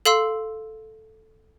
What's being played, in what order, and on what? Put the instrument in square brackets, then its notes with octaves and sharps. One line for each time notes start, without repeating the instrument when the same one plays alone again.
[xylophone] A4 F5 C6 E6